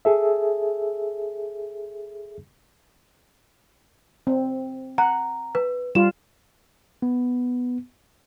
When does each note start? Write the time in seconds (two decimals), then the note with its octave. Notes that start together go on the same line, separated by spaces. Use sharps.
0.05 G#4 A4 E5
4.27 C4
4.98 F#5 A#5
5.55 B4
5.95 G3 F4 E7
7.02 B3